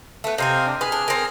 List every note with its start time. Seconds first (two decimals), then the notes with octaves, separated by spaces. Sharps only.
0.24 A3 B3
0.38 C3 C4 C5 D#5 F5 G#5
0.66 D4
0.81 G#4 B4 F6
0.92 D4
1.08 C4 A#4